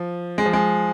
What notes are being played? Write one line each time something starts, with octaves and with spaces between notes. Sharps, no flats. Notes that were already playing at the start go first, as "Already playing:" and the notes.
Already playing: F3
G#3
F3
G#3